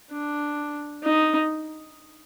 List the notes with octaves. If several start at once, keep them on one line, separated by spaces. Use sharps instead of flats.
D4
D#4